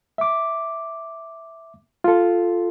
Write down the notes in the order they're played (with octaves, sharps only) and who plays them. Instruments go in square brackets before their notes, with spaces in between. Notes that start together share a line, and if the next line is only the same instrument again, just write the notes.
[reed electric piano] E5 D6
F4 A4